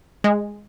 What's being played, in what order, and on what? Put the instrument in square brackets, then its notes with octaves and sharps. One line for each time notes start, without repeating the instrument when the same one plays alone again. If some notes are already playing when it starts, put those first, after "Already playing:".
[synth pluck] G#3